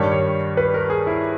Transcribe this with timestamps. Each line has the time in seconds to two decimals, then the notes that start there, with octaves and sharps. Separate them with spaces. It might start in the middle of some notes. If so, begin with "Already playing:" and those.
Already playing: G2 D#3 G3 C#5
0.12 C#5
0.57 B4
0.74 A#4
0.90 G#4
1.07 E4